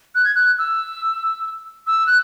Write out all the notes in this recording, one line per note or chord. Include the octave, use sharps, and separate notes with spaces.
F#6
G#6
F#6
E6
E6
F#6